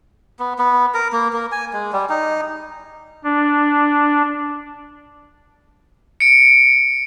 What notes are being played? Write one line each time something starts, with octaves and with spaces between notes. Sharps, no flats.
B3
B3
A#4
A#3
A#3
G#5
G#3
G3
D#4
D4
C#7 D7